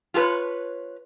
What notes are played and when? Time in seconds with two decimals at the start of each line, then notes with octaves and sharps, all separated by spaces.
0.14 F4 F#4 A4 B4 C#5